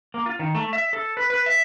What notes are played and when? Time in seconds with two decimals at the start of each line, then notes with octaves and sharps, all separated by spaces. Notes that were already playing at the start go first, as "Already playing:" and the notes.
0.14 A#3
0.26 F4
0.39 D#3
0.55 A3
0.73 E5
0.93 A4
1.17 B4
1.30 B4
1.46 E5